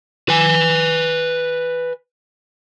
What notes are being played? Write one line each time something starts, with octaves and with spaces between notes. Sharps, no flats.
B4 G#5